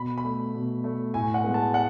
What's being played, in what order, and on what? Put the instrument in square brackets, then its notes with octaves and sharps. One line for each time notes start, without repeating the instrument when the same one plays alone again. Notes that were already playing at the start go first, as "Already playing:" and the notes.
Already playing: [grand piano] B2 B5
B5
A3
B2
A3
A2 G#5
F#5
G#3 B3
A5
F#5